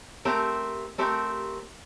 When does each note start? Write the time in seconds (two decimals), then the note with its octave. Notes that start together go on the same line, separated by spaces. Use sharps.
0.25 A3 C4 G4 A#4
0.98 A3 C4 G4 A#4